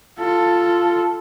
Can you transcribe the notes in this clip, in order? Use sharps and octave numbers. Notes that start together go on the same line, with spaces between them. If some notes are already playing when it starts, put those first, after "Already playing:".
F4 A4